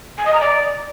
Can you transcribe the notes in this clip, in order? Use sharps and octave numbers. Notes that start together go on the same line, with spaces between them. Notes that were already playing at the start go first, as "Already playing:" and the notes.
G#5
D#5
A#5
D5